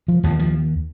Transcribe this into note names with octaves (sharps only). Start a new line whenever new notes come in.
F3
D#2 F3
F3